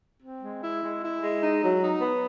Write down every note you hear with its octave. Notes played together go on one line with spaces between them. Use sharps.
C4
G#3
E4
G#3
E4
G#3
D#4
F#3
D#4
B3